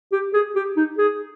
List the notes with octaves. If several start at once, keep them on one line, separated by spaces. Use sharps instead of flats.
G4
G#4
G4
D#4
G#4